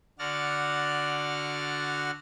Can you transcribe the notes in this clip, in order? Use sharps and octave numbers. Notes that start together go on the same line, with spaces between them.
D3 F#4 D5 F#5 F6 A6